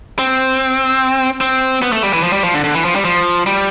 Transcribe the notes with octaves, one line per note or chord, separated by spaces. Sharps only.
C4
C4
B3
A3
G3
E3
F3
G3
F3
D3
D3
E3
F3
G3
F3
G3